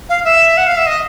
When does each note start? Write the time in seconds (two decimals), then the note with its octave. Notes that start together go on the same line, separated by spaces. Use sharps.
0.09 F5
0.25 E5
0.57 F#5
0.67 F5
0.77 E5
0.86 D#5